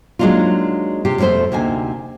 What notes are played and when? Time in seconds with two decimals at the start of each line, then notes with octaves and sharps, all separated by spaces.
0.19 F#3 G#3 A#3 D4 D#4 F4
1.05 C3 F4 G4
1.18 F2 B2 F3 A3 C5
1.52 D2 C3 A#3 D#4 G#5